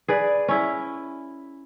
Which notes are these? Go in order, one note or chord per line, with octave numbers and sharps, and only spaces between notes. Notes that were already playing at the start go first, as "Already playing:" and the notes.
G#4 B4 D5
C#4 E4